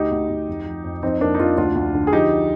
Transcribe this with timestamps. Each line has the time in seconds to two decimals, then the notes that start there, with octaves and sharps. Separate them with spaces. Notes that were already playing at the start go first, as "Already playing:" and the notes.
Already playing: D2 D#4 G4
0.11 D2
0.29 D2
0.48 F2
0.66 F3
0.84 F2
1.03 F2 C4 D#4
1.21 F2 A#3 D4
1.34 D#4
1.39 F2 D4 F4
1.57 D2 D4 F4
1.75 D2
1.95 D3
2.07 G#4
2.13 F3 D#4 G4